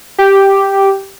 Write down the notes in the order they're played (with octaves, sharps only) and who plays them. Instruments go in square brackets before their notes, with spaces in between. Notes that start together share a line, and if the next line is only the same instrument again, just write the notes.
[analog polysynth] G4